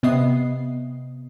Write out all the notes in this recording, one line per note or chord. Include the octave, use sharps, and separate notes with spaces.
C3 B3 D#5 E5 D#6 C7